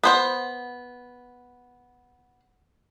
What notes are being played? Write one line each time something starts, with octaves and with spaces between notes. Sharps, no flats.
B3 C5 F#5